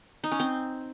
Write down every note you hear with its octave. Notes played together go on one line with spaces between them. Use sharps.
D#4
C#4
C4